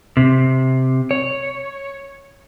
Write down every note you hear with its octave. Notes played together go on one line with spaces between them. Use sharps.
C3
C#5